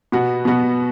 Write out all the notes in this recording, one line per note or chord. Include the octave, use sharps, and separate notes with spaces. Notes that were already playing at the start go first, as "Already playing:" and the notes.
B2 B3 F#4
B2 B3 F#4